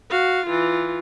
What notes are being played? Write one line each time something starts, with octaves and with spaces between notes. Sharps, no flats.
F#4 F5
E3 F4